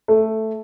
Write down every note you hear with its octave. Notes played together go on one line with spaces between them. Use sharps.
A3